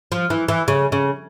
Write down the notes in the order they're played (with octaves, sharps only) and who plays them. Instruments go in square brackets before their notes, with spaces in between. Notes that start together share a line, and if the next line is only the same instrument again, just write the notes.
[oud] F3
E3
E3
C#3
C#3